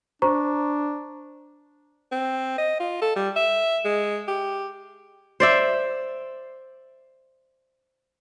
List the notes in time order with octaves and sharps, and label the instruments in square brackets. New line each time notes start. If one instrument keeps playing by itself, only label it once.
[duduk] D4 [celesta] C5 A#5 C#6
[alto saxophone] C4
D#5
F4
A4
G3
E5
G#3
G4
[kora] C5 D5 E5